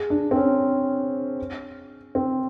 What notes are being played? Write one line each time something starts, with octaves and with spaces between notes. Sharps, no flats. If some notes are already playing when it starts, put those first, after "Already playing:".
Already playing: G#4
D4
C4
C#4
C4